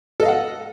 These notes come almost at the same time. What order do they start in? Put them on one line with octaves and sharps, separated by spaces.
A4 D#5 F5 F#5